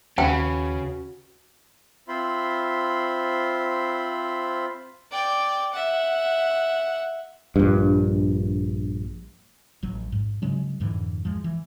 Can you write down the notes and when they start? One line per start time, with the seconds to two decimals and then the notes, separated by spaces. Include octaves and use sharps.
0.18 D#2 C#3 F#4 B4 G5
2.08 C4 F4 C5 E5 B5 C6
5.12 D5 G5
5.73 E5 F#5
7.56 A#1 G2
9.83 A1 F#3
10.12 G#2
10.42 C#3 F#3 G#3 C#4
10.80 F2 G#2 D3 E3
11.25 F3 G#3
11.44 E3